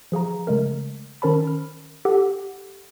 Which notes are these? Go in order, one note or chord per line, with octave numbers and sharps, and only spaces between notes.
F3 G#4 F5 A#5
C#3 G#3 A3 A#4
D#3 C#4 A#4 C5 A5 B5
F6
G4 A4 F#5